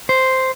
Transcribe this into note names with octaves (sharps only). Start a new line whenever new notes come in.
C5